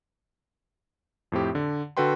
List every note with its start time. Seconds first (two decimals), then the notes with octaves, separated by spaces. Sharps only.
1.32 F2 A2 C4 G4
1.55 D3
1.97 D3 F#4 A4 B4 G5 C6